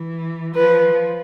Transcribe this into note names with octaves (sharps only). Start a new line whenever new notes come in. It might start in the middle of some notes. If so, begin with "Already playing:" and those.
Already playing: E3
F3 B4